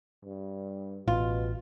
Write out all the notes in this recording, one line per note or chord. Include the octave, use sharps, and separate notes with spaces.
G2
A1 B2 F4